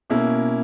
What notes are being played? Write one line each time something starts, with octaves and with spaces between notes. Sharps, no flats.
B2 A#3 C#4 E4